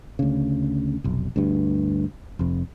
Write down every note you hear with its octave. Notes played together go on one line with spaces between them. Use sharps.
D2 C#3
F1 B1
D2 G2
F1 F2